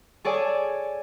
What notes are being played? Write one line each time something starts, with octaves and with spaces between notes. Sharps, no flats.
G#4 A4 C#5 D5 G#5